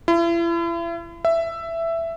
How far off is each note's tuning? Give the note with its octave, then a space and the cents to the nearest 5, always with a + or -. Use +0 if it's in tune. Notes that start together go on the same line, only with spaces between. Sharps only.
E4 +40
E5 +10